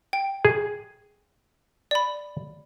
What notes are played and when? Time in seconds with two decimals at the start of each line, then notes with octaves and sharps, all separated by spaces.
0.13 G5
0.45 G#4
1.91 D5 B5